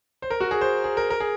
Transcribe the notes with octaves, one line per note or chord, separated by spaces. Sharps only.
C5
A#4
F#4
G#4
C5
G#4
A#4
A#4
G#4